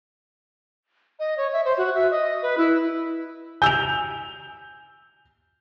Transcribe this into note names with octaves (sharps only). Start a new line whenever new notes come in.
D#5
C#5
E5
C5
F#4
E5
D#5
B4
E4
G#5 E6 G6 F7